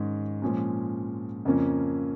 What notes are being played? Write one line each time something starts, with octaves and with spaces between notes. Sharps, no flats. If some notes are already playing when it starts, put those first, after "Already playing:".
Already playing: G#2 D#3 G#3 C#4
A#2 F3 G#3 C#4
F2 C#3 F3 A#3 C#4